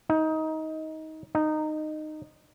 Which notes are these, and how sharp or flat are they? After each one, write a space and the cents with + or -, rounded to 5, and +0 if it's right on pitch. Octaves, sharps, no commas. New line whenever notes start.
D#4 +20
D#4 -15